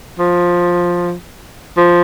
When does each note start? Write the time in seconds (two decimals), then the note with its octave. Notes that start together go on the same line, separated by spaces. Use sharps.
0.19 F3
1.77 F3